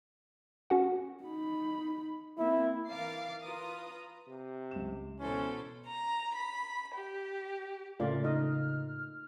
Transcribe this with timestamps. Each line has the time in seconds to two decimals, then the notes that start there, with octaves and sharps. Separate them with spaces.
0.70 C#4 F#4 F#5
1.24 D#4 B5
2.38 A#3 C4 E4
2.89 E3 A#4 F5 D6 A6 C7
3.42 F4 B4 A#5 D#6
4.28 C3
4.71 C#2 E7
5.20 B2 E3 C#4 A4 C5
5.87 A#5
6.35 B5
6.95 G4
8.00 A2 C#3 A3 A#3 F4 D5
8.24 D#4 D#5 F6